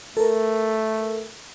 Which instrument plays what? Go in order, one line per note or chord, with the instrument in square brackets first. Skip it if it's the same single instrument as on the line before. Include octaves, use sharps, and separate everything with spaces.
[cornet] A3 [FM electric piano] A4 A#4